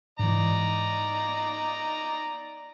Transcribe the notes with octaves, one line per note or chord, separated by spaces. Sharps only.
G#2 E3 D#4 D5 A#5